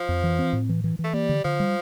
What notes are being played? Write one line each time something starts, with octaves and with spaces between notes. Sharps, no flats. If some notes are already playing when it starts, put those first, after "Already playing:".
Already playing: F3
F2
E3
C4
A2
E3
E3
E3
A3
G3 A#3
D3
D3 F3
G3